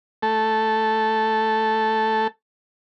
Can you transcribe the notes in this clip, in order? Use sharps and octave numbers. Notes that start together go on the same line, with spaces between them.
A3 A4